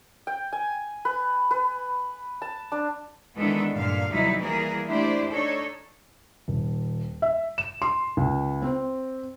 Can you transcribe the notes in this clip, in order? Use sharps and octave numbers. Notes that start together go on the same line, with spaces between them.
G5
G#5
B4
B4
A5
D4
D#3 E3 G#3 B3 D4 A4
G2 A#2 D3 F5
D#2 C3 F#3 G3 D#4 E4
E3 G3 A#3 G#4 A#4
A3 D4 E4 G4 C5 D5
D4 D#4 A4 C#5
D#1
E5
E7
C6
C#2
C4